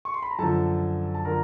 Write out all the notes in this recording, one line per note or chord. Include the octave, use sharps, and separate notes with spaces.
C#6
C6
B5
A#5
F#2 D3 F3 A4 A5
A5
D3 F3 A#4 A#5